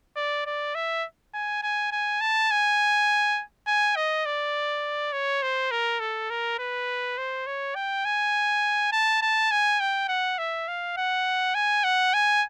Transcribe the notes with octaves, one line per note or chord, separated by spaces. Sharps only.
D5
D5
E5
G#5
G#5
G#5
A5
G#5
G#5
D#5
D5
C#5
C5
A#4
A4
A#4
B4
C5
C#5
G5
G#5
A5
A5
G#5
G5
F#5
E5
F5
F#5
G#5
F#5
G#5